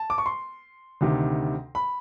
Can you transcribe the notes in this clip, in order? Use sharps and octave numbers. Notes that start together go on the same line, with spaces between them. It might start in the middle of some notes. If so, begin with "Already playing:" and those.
Already playing: A5
D6
C#6
C6
D2 C3 D#3
B5